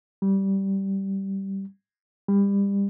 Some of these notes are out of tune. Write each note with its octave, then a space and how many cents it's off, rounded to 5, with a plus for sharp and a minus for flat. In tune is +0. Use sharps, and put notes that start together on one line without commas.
G3 -10
G3 +30